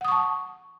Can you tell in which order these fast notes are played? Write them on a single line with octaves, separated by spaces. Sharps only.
F#5 D#6 C#6 A5